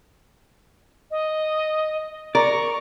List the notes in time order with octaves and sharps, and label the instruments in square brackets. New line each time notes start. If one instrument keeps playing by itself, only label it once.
[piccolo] D#5
[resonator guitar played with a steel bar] A#4 [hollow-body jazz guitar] D5 [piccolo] C#6